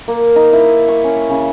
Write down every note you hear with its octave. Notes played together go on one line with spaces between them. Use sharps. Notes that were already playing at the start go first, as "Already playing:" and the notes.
A#3
D#4
E4
C#6
C#4
C#3